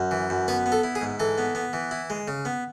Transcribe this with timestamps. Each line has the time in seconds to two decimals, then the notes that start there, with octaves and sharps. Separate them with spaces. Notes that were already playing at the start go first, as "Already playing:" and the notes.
Already playing: F#2
0.11 E3
0.30 F#2
0.48 B3 B4
0.66 B3
0.72 A4
0.84 E4
0.95 G#4
1.01 G#2
1.20 E3 A4
1.38 B3
1.55 B3
1.73 E3
1.91 E4
2.10 G#3
2.28 C#3
2.45 B3